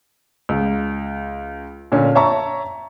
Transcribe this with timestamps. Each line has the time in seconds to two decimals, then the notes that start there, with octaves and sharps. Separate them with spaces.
0.49 C#2
1.92 A#2 D3 C#4
2.15 C#5 E5 A5 A#5 C#6